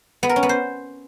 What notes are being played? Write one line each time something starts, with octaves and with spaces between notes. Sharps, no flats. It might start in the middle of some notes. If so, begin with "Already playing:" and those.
B3
A#4
C#4
B3
C5